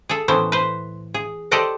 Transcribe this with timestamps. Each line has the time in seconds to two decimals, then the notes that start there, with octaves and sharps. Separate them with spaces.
0.09 G#4 A4
0.28 A2 E3 B3 C#4 C5
0.52 B4 C5
1.14 G#4
1.51 G4 A4 C5 D5 D#5 F#5